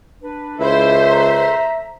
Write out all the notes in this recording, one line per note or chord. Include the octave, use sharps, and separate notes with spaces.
D4 B4
C#2 E4 A4 C5 E5
A#5